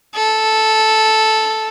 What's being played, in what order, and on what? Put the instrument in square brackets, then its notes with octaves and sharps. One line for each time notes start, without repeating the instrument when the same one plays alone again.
[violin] A4